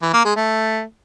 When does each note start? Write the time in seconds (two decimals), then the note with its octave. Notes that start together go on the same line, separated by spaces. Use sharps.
0.02 E3
0.13 A#3
0.25 G#3
0.36 A3